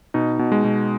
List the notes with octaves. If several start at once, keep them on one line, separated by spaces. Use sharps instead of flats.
B2 D#4
B2
G#3
B2